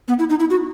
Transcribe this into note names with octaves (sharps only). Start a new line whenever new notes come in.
B3
E4
D#4
E4
F#4